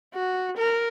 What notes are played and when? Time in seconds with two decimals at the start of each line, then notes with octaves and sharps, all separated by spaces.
0.14 F#4
0.57 A#4